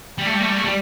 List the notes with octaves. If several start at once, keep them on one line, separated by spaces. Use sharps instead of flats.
G3
A3
G3
A3
G3
A3
G3